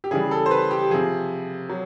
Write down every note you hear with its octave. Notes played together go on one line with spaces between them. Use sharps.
G4
C#3 E3 G3 G#4
A4
C5
B4
G4
C3 F3 G#4
F#3